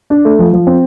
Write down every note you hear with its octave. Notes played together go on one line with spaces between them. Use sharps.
D4
A3
F3
F3
C4